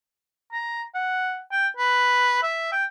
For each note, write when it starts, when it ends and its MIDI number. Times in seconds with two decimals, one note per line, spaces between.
0.52 0.82 82
0.95 1.41 78
1.51 1.67 79
1.77 2.43 71
2.43 2.71 76
2.72 2.84 79